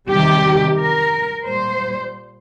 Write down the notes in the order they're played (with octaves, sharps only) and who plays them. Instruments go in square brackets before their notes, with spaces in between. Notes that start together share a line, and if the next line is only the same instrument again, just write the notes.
[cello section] C3 D#3 G3 G4
A#4
A#2 G3 C5